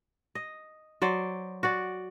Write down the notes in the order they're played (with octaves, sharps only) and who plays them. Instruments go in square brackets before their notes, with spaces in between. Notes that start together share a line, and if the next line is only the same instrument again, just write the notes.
[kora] D#5
F#3 C5 D5
F#4 D5